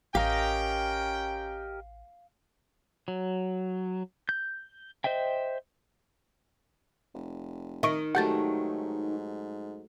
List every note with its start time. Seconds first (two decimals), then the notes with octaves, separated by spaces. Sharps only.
0.15 A1 C#4 G4 A#4 D#5 F5 G5
3.08 F#3
4.29 G6
5.04 C5 D#5 E5 G5
7.14 F1
7.83 D#3 D#5 E5 C#6 D7
8.15 G#2 F#3 A3 G4 F#5 G6 A6